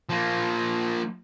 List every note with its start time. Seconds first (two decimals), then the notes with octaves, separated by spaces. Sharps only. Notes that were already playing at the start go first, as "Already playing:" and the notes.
0.10 F3 A#3